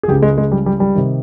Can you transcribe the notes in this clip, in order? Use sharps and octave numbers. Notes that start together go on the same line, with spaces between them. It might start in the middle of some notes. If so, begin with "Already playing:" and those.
G#4
C#2 C#3 G4
G#3
G#3
G3
G3
G3
C3 D#3